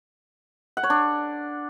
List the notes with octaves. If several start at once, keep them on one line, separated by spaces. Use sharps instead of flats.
F#5
C#5
D4